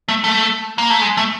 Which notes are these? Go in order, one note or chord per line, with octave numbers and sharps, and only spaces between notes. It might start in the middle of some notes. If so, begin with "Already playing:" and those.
A3
A3
A#3
A3
G#3
A3